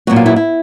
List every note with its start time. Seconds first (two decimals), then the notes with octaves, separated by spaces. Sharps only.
0.07 A#2 F#3 B3 F#4
0.16 F4
0.26 E4
0.36 E4